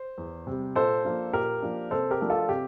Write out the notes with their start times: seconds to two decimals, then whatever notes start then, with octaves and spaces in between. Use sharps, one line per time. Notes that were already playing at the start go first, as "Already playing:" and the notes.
Already playing: C5
0.18 E2
0.47 C3 G3
0.76 A#2 A4 C5
1.05 F3 A#3 D4
1.33 A#2 G4 A#4
1.62 F3 A#3 D4
1.91 C3 A4 C5
2.11 G4 A#4
2.21 F3 A3 D4
2.30 F4 A4
2.49 C3 G4